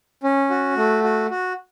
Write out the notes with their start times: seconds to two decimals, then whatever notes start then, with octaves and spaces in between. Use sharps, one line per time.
0.23 C#4
0.50 F#4
0.76 A3
1.04 F#4
1.30 F#4